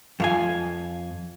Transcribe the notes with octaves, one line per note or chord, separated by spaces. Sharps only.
F2 F5 G#5